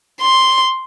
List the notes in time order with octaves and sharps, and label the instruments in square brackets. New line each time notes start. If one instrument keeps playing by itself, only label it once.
[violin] C6